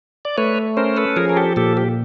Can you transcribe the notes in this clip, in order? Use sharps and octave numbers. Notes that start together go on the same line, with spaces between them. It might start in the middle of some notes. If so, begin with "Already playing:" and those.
D5
A3 B4 C#5
C#4 A#4 C5
A4 B4
F3 G#4 A#4
A#4
G4 A4
A#2 G4 A4
G4